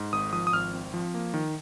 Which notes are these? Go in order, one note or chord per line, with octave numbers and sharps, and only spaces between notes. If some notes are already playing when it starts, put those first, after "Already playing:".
Already playing: G#2
G#1 D#6
F3 D#6
D#6
G#1 F6
C4
F3
A#3
D#3